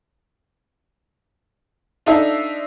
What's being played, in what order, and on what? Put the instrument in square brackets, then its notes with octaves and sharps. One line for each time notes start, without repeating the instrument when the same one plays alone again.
[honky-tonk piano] D4 D#4 F4 A4 E5